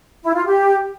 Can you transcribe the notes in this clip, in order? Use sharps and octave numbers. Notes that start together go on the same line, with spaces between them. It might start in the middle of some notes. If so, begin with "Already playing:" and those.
E4
F4
G4